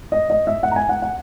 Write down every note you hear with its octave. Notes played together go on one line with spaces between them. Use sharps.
D#5
D#5
E5
F#5
A#5
G#5
F#5
F#5